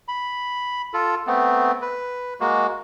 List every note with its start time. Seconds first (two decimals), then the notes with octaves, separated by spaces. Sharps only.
0.08 B5
0.94 F4 A4
1.27 A3 B3 C4
1.82 B4
2.40 G#3 A#3 F#4